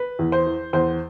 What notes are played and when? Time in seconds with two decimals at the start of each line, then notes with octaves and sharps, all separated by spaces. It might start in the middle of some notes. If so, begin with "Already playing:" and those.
Already playing: B4
0.19 E2
0.32 C5
0.46 E3
0.73 E2 C5